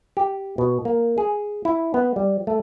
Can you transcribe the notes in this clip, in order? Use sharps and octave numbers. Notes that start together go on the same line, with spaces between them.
G4
B2
A#3
G#4
E4
B3
G3
A3